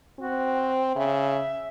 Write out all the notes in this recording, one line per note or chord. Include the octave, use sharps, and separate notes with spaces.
C4 F#4
C#3 E5